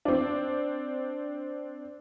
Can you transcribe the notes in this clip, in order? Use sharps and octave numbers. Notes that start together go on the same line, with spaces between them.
C4 D4